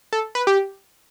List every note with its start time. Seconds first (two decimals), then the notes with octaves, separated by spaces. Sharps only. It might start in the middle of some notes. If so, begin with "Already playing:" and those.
0.13 A4
0.35 B4
0.47 G4